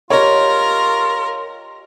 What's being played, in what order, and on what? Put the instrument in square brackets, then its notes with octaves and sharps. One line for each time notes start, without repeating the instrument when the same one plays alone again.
[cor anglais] F4 [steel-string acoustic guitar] G4 D#5 [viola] A#4 [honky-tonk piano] C#5